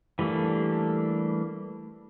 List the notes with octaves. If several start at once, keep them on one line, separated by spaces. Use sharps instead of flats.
E3 G3 A3 A#3 D4